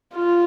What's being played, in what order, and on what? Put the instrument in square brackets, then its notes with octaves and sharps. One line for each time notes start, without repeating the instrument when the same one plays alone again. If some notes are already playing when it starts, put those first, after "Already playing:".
[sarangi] F4